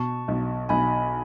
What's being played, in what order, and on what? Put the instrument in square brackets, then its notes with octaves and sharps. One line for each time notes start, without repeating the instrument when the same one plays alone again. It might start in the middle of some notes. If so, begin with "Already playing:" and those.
Already playing: [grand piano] B2 [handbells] A5 C#6
[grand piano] B1
[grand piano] B1 [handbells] G#5 B5